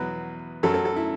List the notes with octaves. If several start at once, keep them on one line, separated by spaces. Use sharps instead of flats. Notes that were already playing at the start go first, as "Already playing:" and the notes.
Already playing: E2 B2 F#3 B4
F#2 F#3 A4
A4
A4
E4